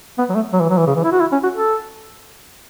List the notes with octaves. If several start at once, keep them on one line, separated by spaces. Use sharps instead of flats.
B3
F#3
A3
F#3
E3
F#3
E3
C#3
E3
E4
F#4
E4
C#4
F#4
A4